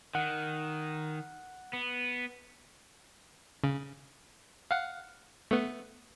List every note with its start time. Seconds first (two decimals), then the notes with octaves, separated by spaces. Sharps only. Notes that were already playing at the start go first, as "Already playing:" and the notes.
0.15 D#3 F#5
1.73 B3
3.64 C#3
4.71 F5 F#5
5.51 A3 B3